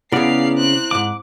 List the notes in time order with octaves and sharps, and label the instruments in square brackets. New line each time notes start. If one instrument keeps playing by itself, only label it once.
[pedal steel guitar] C#3 D5 [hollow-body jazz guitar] B3 G#4 [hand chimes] E4 [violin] F5 C7
[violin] C4 F#6
[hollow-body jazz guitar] D#2 G#2 [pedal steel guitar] D6